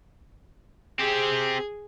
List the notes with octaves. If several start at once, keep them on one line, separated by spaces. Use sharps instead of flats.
C4 G4 G#4